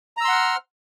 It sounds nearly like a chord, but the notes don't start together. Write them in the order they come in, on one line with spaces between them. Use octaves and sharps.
A#5 E6 C6 F#5 F6